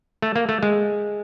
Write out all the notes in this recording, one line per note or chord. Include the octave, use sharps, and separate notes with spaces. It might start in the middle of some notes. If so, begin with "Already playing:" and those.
A3
A#3
A3
G#3